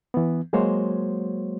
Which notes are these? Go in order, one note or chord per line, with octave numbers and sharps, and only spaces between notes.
E3 B3
F#3 G#3 A#3 F#4 C5 C#5